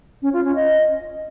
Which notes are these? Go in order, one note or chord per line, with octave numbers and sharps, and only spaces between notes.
C#4
F4
C#4
D#5